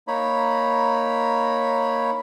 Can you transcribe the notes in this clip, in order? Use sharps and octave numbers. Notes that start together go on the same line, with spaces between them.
A#3 D#4 C#5 B5